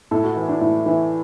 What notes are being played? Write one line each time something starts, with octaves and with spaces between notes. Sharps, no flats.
A2 A4
F#4
E3 E4
D4
A2 E4
E3 E4